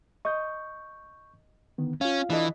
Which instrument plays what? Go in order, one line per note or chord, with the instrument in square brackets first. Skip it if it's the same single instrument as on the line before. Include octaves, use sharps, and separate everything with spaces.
[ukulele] D#5 [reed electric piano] C#6 G6
[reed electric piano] D3 D#3 B3
[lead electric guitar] C#4 [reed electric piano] F4 F5
[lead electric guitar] E3 [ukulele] D4 A4 D#5